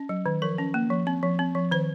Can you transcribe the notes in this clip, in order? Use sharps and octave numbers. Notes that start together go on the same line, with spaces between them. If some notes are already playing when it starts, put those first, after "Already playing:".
Already playing: C#4
F#3
D#3
F3 A#4
C#4
A#3
F3
C4
F3
C4
F3
D#3 C5